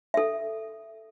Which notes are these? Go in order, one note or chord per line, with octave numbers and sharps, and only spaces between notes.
A4 E5